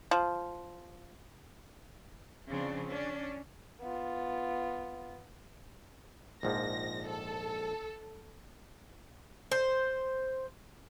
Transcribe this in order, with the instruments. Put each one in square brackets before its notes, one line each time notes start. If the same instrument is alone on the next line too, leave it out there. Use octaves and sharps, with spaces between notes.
[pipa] F3
[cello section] C#3 F3 C4 D4
C#4 D4
[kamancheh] B3 F4
[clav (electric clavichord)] A#1 G#2 F3 [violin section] A#6
[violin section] A4
[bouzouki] C5